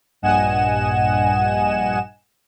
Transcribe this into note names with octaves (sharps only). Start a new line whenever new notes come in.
A#1 G2 D#5 F#5 G#5 E7